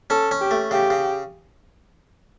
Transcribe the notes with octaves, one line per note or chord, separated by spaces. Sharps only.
C#4 A4
C#4
G4
A3
C#3 G4
C#3